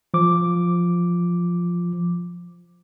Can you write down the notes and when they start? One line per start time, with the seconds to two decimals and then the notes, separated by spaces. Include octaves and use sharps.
0.14 F3 D6